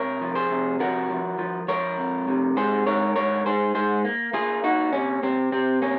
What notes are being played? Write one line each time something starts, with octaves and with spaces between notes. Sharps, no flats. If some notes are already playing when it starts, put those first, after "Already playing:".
Already playing: C3 A#4 C#5
F3
G#4 C5
C3
F3 F#4 A#4
F3
F3
F3 A#4 C#5
F2
C3
G#2 G#4 C5
G#2 A#4 C#5
G#2 A#4 C#5
G#2 G#4 C5
G#2 G#4 C5
A#3
A#3 F4 G#4
A#3 D#4 F#4
C3 C#4
C3 C4
C3 C4
A#3 C#4